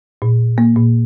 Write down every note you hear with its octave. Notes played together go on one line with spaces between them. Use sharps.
A#2
A#3
A#2